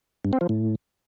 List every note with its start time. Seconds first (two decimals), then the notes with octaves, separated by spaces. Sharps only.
0.25 G2
0.33 C4
0.41 F3
0.49 A2